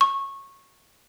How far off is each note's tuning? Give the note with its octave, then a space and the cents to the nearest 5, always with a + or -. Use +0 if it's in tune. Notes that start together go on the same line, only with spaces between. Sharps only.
C#6 -15